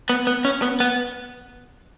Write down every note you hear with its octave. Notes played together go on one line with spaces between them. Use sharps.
B3
B3
C#4
B3
B3